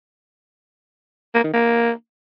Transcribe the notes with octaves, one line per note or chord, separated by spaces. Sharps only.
A#3
D#3
A#3